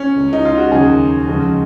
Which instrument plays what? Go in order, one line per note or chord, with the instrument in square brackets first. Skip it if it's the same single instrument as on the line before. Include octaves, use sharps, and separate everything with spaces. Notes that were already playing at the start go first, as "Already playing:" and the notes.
Already playing: [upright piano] C#4
[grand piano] C#2 C#3 G#3
[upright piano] D#4
F4
F#4
[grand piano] D#2 C#3 F#3 C#4 F#4 [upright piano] G#4
[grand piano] F2 C#3 G#3